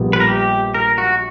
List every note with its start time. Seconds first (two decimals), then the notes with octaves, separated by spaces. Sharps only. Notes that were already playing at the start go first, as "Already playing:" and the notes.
Already playing: A#1 A#2 G3 B3
0.13 B4
0.20 A#4
0.27 G4
0.74 A#4
0.98 F#4